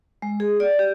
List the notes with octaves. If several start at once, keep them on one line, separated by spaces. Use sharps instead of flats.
G#3
G#4
D5
G4